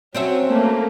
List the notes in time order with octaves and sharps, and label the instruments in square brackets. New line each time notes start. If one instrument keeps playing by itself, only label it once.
[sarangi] F#3 [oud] C4 C#4 E5
[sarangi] A3 [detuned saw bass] A#3